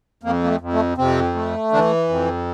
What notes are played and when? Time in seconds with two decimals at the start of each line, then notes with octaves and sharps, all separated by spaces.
0.23 F2 A#3
0.44 A#3
0.48 A3
0.61 F2
0.73 A3
0.98 F2 C3 C4
1.35 A3
1.72 D3 E3 D4
2.09 F2